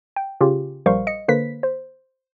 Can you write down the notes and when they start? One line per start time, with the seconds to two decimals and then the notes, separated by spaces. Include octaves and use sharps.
0.16 G5
0.41 C#3 C#4 F4 G4
0.86 A#1 G3 A#4 C5 F5 C#6
1.07 D#5 C#7
1.28 D3 A#3 B4 C5 B6
1.63 C5